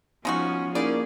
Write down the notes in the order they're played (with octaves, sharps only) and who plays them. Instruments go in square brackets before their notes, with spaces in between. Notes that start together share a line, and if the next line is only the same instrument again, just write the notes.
[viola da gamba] F3 C#4 [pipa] G#3 D#4 F#4 [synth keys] B3
[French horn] A#3 [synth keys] C#4 D#4 E4 [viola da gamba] G#4 [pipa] D5